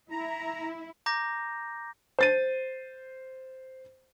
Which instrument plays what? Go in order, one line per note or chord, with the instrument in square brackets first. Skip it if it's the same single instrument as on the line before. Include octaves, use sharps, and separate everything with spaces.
[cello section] E4 [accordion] A#5
[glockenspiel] A#5 D6 G6 A#6
[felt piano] C5 A6 D#7